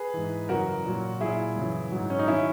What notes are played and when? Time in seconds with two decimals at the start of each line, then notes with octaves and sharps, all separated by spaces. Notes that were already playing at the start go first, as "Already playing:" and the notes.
Already playing: G#4 B4
0.14 G#2 E3
0.49 F#2 C#3 E3 F#4 A#4
0.85 A#2 F#3
1.20 A#2 F#3 E4 G#4
1.56 F#2 C#3 E3
1.92 G#2 F#3
2.10 C#4
2.19 D#4
2.28 D#3 F#3 C#4 E4